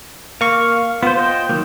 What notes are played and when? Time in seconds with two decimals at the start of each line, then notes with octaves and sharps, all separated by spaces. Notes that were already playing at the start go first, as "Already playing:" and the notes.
0.41 A#3 F5 C#6
1.03 B3 F4 C5
1.17 C5 D#5 G5
1.49 D#3 F#3 A#3